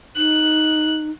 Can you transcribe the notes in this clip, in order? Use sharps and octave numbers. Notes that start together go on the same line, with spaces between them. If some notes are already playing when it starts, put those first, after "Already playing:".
D#4 F#6